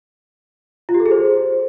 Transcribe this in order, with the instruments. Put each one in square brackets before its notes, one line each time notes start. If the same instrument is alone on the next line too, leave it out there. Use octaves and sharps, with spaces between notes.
[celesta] F4
G4
A4
G#4
C5